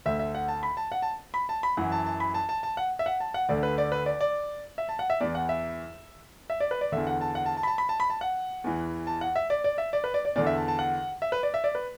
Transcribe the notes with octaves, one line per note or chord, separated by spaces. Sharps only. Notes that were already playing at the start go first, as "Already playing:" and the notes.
D2 D3 E5
E5
F#5
A5
B5
A5
F#5
A5
B5
A5
B5
F#2 E3 F#5
A5
A5
B5
A5
A5
A5
F#5
E5
F#5
A5
F#5
D2 D3 D5
B4
D5
B4
D5
D5
E5
A5
F#5
E5
E2 E3 D5
F#5
E5
E5
D5
B4
D5
E2 D3 E5
F#5
A5
F#5
A5
A5
B5
A5
B5
A5
B5
A5
F#5
E2 E3
A5
F#5
E5
D5
D5
E5
D5
B4
D5
D5
E2 D3 D5
E5
A5
A5
F#5
E5
B4
D5
E5
D5
B4